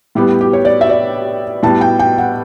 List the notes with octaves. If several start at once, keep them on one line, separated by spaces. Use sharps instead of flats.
A2 G3 B3 G4
G4
C#5
D5
E5
D5
A2 G3 B3 A5
G5
G5
F#5